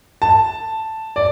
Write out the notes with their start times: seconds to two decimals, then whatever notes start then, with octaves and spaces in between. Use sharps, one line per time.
0.22 A5
1.16 D5